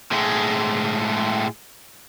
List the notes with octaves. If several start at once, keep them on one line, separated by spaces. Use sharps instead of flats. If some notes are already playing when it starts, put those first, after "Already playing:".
A2 G#3